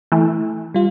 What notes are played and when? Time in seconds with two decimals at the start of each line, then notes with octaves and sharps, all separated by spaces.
0.12 E3 A3
0.74 G3 F4